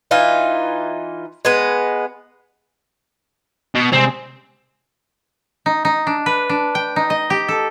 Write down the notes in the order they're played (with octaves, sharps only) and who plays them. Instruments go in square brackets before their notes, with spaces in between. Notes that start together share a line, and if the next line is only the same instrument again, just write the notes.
[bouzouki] E3 D#4 F4
G#3 B3
[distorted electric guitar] B2
[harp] C3 G3 G#3 [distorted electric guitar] C4
[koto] D#4
D#4
D4
B4
D4
G5
D#4
D#5
G4
A4